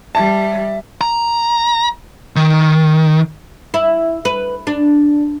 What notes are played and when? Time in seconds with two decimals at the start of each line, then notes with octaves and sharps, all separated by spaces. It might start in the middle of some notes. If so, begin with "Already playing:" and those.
0.15 G3 E5 A5
1.01 A#5
2.36 D#3
3.74 E4
4.25 B4
4.67 D4